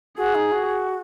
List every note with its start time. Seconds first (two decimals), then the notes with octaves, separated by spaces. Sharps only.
0.17 F#4 G#4
0.35 D#4
0.52 F#4